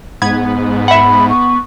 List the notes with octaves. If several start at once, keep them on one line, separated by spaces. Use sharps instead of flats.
G#2 B3 G#6
E5 F#5 B5
C#6